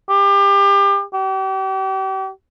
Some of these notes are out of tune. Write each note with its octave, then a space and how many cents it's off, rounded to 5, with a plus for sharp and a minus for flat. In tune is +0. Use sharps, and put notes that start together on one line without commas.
G4 +30
G4 -40